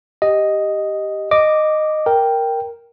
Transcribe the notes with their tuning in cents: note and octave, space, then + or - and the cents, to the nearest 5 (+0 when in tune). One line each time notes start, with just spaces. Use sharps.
G4 +0 D#5 +0
D#5 -10 D6 +0
A#4 +0 G5 +0